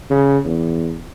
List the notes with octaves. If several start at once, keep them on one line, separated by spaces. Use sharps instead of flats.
C#3
E2